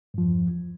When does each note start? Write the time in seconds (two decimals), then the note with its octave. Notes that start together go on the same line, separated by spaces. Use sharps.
0.14 G2
0.18 F3
0.22 E2